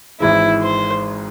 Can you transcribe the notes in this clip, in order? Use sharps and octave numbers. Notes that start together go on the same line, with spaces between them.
G#1 G#2 E3 G#3 E4
C5